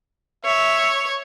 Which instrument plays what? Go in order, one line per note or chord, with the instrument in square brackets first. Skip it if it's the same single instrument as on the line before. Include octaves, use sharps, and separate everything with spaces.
[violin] C#5 [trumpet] E5